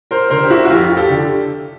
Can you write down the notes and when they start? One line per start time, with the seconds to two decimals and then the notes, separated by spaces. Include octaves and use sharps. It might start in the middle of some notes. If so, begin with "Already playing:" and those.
0.11 A#4 C5
0.30 D3 A#4 C5
0.44 G4
0.50 E4 F#4
0.65 F#4
0.70 F2 F4 G4
0.97 G4 A4
1.10 D3